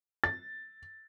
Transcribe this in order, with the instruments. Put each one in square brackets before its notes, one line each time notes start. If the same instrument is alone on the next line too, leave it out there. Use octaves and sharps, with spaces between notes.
[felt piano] A6